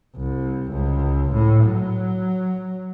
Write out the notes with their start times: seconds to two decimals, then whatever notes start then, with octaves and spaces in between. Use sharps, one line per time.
0.16 C2
0.71 C#2
1.33 A2
1.66 F#3